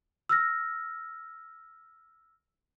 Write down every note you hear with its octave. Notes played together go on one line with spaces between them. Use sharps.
E6 F6 A#6